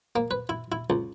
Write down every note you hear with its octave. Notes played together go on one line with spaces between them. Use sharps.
A#3
B4
E4
E4
C#2